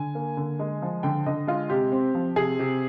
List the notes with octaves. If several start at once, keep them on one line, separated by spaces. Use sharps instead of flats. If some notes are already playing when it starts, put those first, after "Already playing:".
Already playing: D3 G#5
A#3
D3
G#3
F3
D3 G5
D3 D#5
G#3 F4
C3 G4
C4
F3
C3 G#4
C3